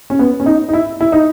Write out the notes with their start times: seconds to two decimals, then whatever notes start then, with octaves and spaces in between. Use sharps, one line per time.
0.10 C#4
0.19 B3
0.40 C#4
0.46 D#4
0.69 D#4
0.73 E4
1.01 E4
1.12 D#4